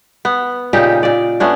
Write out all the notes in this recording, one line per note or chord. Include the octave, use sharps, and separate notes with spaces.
B3
A#2 C#3 D#4 G4
A#2 D5
A3 B3 C#4 D4